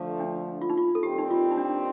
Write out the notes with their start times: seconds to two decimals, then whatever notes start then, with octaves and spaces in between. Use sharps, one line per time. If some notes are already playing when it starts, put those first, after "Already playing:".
Already playing: D3 F3 A3
0.20 D4
0.61 F4
0.70 D#4
0.77 F4
0.95 A4
1.03 D#2 D#3 G3 C4 G4
1.18 D#4
1.30 F4
1.52 D#4
1.57 D4